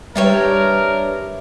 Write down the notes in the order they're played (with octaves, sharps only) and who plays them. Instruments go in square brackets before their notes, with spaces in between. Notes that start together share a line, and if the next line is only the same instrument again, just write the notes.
[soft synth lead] G3 [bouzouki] D4 G4 C#5 [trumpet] A#4 [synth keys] B4 E5